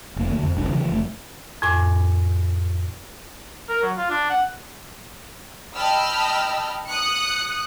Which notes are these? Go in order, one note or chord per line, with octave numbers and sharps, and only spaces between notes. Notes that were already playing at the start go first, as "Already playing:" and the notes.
F1 A#3
D2 D3
F2
F#1 C2 D4
C#3 E3 F3
F#1 A3
F2 A2 G#5 D6
A#4
F#3
F4
D4
F#5
D#5 G5 A5 B5 E6 F6
D#6 F#6 C#7